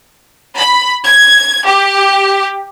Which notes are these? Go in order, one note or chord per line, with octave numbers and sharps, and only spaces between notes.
B5
G#6
G4